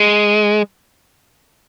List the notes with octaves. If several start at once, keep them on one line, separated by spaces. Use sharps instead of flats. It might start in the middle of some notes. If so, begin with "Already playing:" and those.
Already playing: G#3